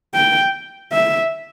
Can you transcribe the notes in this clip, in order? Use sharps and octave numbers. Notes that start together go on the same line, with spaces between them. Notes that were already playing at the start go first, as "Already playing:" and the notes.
G5
E5